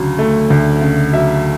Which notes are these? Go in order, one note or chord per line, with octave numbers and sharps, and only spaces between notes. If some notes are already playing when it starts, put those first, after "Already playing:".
Already playing: D2 C#3 F#3
A3
D2
C#3
F#3 E5